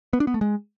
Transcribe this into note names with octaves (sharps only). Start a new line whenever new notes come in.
B3
D4
B3
A3
G#3